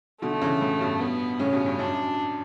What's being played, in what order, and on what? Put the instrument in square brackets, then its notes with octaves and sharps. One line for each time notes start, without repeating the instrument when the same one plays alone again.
[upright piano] B2 D3 [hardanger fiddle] A3
[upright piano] D3
C#3 E3
A2 C#3
G2 B2
[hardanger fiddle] B3
[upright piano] A2 C#3 [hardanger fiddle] C#4
[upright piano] G2 B2
G2
[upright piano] F#2 [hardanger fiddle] D4